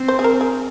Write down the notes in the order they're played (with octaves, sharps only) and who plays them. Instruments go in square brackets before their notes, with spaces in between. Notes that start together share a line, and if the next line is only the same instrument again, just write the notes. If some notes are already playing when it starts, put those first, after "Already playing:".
Already playing: [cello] C4
[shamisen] C5
G#4
A#4
G#4